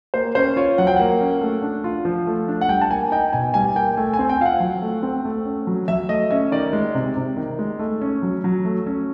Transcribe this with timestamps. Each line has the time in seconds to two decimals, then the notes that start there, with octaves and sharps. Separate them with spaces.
0.14 A#3 C5
0.35 C#4 C5
0.56 F4 C#5
0.78 F#3 F#5
0.87 G5
0.96 A#3 F#5
1.21 C#4
1.41 A3
1.62 D4
1.84 F4
2.05 F3
2.27 A3
2.48 D4
2.61 F#5
2.69 G3 G5
2.81 A5
2.90 A#3 G#5
3.12 D#4 G5
3.33 B2 G#5
3.54 G3 G#5
3.75 A#3 G5
3.97 A3 G#5
4.14 G#5
4.19 C4
4.29 G5
4.40 F4 F5
4.45 F#5
4.60 F#3
4.82 A3
5.03 C4
5.25 A3
5.45 C#4
5.67 F#3
5.88 F#3 E5
6.09 A3 D#5
6.31 C#4 E5
6.52 D#3 D5
6.73 G#3
6.95 C3
7.17 C3
7.37 D#3
7.59 G#3
7.79 A3
8.02 C#4
8.23 F#3
8.44 F#3
8.65 A3
8.87 C#4